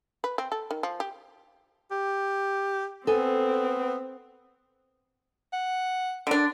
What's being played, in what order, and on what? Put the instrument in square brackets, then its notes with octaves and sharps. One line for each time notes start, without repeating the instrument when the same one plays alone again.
[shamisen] B4
C4
A4
D#3
F3
G4
[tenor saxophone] G4
[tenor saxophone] B3 [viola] C4 [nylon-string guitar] A4 G#5
[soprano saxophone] F#5
[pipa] D3 D4